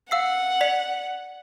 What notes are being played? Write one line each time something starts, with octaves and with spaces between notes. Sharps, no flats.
F5 F#5 E6 C7
D5 B6 F7